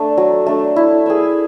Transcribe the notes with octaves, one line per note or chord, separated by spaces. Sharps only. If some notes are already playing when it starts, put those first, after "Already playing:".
Already playing: A3 D4
F#3
A3 D4
E4
G#4 B4 E5